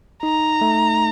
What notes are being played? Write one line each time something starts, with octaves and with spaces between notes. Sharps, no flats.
D#4 A#5
A3